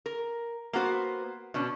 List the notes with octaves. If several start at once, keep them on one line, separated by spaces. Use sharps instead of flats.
A#4
A#3 B3 F#4 C5
B2 C#4 D4